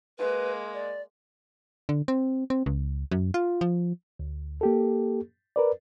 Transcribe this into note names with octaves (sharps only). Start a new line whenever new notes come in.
G#3 A#3 B4
D5
D3
C4
C4
C#2
F#2
F4
F3
D2
A#3 G4 A4
A#4 B4 D5